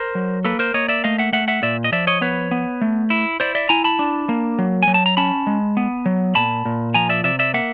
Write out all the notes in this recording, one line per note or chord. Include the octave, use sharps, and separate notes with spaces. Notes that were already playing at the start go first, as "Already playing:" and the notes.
Already playing: A#4 C5
F#3
A#3 A4 B4
A#4 C5
A#3 C#5 D#5
D5 E5
A3 D#5 F5
E5 F#5
A3 E5 F#5
E5 F#5
A#2 D5 E5
D#5
F3 D5 E5
C#5 D#5
B3 B4 C#5
B3
A3
E4
E4 C5 D5
D5 E5
E4 G#5 A#5
A5 B5
D4
A#3
F#3
F#3 G#5
A5
A#5
C#4 A5 B5
G#3
B3
F#3
A#2 A5 B5
A#2
F3 G#5 A#5
D5 E5
C3 D5 E5
D5 E5
A#3 E5 F#5